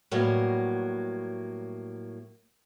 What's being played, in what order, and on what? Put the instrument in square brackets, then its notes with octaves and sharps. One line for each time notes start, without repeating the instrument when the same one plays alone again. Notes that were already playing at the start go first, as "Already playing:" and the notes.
[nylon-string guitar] A2 F#3 G3 A#3 B3